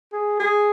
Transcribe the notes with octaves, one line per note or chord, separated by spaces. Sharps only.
G#4
G#4